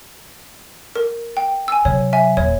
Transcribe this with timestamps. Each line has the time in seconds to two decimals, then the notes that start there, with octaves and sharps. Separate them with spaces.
0.96 A#4
1.37 G5
1.68 G#5 E6
1.85 C3 F#3 C#5
2.13 E5 G#5
2.37 D#1 C#5